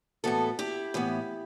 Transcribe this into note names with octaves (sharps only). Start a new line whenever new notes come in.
A2 E3 B3 F#4 A4
E4 G4
A2 E3 B3